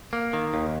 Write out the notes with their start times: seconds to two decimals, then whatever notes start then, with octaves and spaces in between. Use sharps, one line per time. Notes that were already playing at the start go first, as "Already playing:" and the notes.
0.13 A#3
0.33 D#3
0.54 D#2